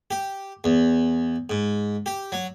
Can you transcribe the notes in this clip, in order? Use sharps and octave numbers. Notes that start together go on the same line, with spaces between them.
G4
E2
G#2
G4
F#3